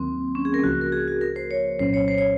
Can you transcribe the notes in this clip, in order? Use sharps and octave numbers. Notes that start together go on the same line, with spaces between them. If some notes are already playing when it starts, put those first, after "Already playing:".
Already playing: D#2 D#3 F#3 A#3 C4
C#4
G#4
A#4
C#2 C#3 F3 A#3 F#4
A#4
G#4
F#4
A#4
C5
C#5
C2 A#2 F#3 C#4 C5
C#5
C5
C#5